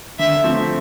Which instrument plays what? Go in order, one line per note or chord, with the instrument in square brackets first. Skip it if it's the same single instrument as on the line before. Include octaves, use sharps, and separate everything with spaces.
[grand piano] D3 [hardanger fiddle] E5
[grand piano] F3 A3 C4